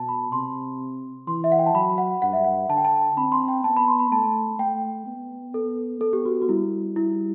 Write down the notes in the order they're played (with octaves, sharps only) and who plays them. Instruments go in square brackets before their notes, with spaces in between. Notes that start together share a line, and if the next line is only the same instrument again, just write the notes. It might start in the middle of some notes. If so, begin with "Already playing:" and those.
Already playing: [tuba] B2 [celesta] A5
[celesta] B5
[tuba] C3 [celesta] C6
[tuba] E3 [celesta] C6
[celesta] E5
F#5
G5
A5
[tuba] F#3 [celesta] B5
[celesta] F#5
[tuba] G2 [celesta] F#5
[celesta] E5
F#5
[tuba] D3 [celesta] A5
[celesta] G5
A5
[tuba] C4 [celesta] B5
[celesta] C6
G5
[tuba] B3 [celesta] A5
[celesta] B5
C6
B5
[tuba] A3 [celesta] A5
[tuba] A3 [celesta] G5
[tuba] B3
[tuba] B3 [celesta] A4
[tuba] B3 [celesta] A4
[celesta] G4
F#4
F#4
[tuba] G3 [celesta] E4
[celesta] E4